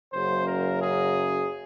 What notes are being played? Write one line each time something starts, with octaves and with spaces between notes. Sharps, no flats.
F#1 F#2 C#3 F#3 C5
A#4
G#4